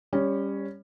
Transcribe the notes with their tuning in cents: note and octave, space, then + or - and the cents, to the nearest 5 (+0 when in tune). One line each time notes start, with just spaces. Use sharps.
G3 +20 C#4 +0